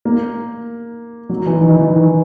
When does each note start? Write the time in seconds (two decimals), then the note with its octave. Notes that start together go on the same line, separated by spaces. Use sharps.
0.05 A#3
1.29 F#3
1.46 E3
1.61 D#3
1.77 E3
1.93 D#3